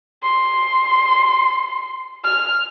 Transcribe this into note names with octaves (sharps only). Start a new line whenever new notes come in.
C6
F6